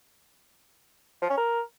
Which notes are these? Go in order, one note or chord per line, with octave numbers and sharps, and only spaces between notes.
F3
C#4
A#4